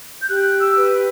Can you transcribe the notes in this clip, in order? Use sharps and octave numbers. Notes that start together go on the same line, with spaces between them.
G6
G4 F#6
E6
B4